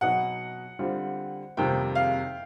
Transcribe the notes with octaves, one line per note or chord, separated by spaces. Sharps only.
B2 F#3 B3 D#4 F#5
D3 G3 C4 F4
F2 C3 D#3 G3 A#3 G5
F5